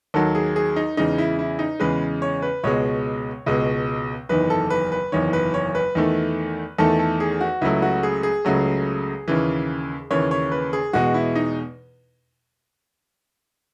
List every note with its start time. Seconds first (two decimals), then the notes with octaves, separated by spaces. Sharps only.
0.14 D#2 D#3 F#3 A4
0.35 G#4
0.56 G#4
0.76 D#4
0.97 E2 C#3 G#3 D#4
1.18 E4
1.39 E4
1.59 D#4
1.80 E2 C#3 G#3 B4
2.22 C#5
2.42 B4
2.63 C#2 B2 G#3 C#5
3.46 C#2 B2 G#3
4.29 F#1 E2 D#3 B4
4.50 A4
4.70 B4
4.92 B4
5.12 F#1 E2 D#3 C#5
5.33 B4
5.54 C#5
5.75 B4
5.95 E2 D#3 A3
6.79 E2 D#3 A3 A4
6.99 A4
7.20 G#4
7.41 F#4
7.61 C#2 C#3 F#3 A3 E4
7.82 F#4
8.03 G#4
8.23 G#4
8.45 C#2 C#3 F#3 A3
9.28 D#2 C#3 E3
10.11 D#2 C#3 E3 C#5
10.31 C#5
10.52 B4
10.73 G#4
10.93 E2 B2 G#3 F#4
11.14 E4
11.35 D#4